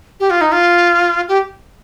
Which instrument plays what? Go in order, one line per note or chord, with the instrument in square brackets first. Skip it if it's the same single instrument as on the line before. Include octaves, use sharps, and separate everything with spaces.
[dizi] G4
F4
D#4
F4
G4